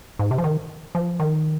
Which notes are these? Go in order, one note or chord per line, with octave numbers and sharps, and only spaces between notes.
G#2
C3
F3
D#3
F3
D#3